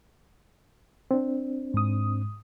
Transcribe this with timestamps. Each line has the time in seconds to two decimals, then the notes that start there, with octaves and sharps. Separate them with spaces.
1.11 C4 D4
1.74 G#2 D#6